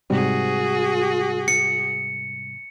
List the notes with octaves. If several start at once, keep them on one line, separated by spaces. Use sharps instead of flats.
G#2 C3 G3 F#4 G#4
C#7